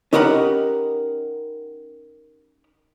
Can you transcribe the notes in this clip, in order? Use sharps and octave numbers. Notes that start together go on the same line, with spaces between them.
C#4 D#4 G4 A#4 F#5 B5